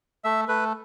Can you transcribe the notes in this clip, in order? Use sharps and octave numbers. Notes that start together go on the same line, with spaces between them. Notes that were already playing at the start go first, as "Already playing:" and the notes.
A3 E5
A3 B4